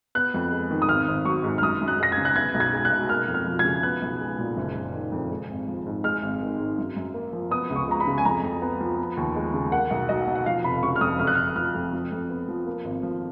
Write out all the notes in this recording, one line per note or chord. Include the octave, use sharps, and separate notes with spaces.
B3 F#6
F2
G#3
D#3
D#6
G#1 F6
G#1
F#3 C#6
G#2
F6
F#2 D#6
F#2
F#6
G#3 A#6
G#6
C#3
F#6
B3 G#6
B1
G#6
G#3
F#6
B2
A#3 F6
F2
F6
F3
G#6
C#3
B3 F#6
B1
G#3
A#2
F#1
F#1
D#3
F2
G#3
G#1
F3
G#2
G#3 F6
G#1
D#3
G#2
F#2
F#2
A#3
F3
B3 D#6
C#2
C#6
G#3 A#5
B5
C#3
G#5
F2 A#5
F2
B3
F3
B3
D#2
G#3
C#3
A#3 F#5
B1
F#3 D#5
B2
F#5
F3 F5
F1 B5
C#3 C#6
F6
F2 D#6
F#1 F6
F#6
F6
F#1
F3 F6
F2
F2
F2
B3
F3
A#3
G#1
F3